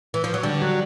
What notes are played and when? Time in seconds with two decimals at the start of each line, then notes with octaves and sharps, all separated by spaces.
0.14 E3
0.24 F3
0.34 F#3
0.43 D3 G3
0.62 F#3